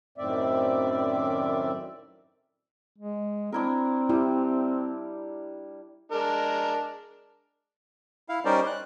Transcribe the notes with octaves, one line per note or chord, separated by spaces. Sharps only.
F#2 A2 D#3 C4 D5 E5
G#3
C4 D4 E4 A#4
G3 E4
G#3 D4 A#4
E4 F5
G3 C#4 D#4 A#4 C5 D5
F#6